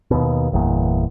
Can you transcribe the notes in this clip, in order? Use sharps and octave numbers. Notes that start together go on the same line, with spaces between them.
D#2 B2
G1 E2 A#2